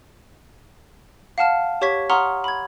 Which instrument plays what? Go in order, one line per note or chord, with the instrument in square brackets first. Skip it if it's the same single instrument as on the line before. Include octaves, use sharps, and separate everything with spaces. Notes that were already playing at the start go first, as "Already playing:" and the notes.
[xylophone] F5 F#5 A5 F6 E7
G4 C#5 C#6 G#6 B6
F#5 A#5 C6 C#6 D#6 F6
B5 G#6